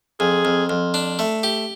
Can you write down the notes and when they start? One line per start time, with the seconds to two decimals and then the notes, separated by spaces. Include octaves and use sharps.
0.20 F2 G#4
0.45 F2
0.69 F2
0.94 D4
1.19 A3
1.43 G4